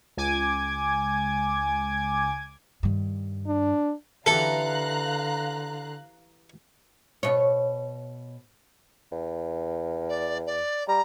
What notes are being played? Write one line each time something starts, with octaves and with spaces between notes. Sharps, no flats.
C#2 G#5 D6 G#6
G2 D#3
D4
D3 E3 G4 A4 F5 A#5 F#6
B2 C#5
E2
D5
D5
G3 A#5